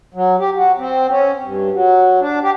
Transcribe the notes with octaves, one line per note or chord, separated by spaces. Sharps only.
F#3
G4
F#4
C4
C#4
G2
F#3
D4
G4